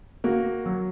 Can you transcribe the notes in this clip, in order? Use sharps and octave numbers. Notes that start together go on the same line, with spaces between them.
A#3 F#4
F#3 F#4